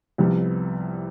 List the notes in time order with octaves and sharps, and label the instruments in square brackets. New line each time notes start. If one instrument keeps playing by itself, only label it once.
[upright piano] C2 C3 G3 B3 [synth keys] F3